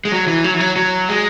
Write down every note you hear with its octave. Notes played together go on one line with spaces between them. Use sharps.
G#3
F#3
E3
F#3
E3
F#3
F#3
G#3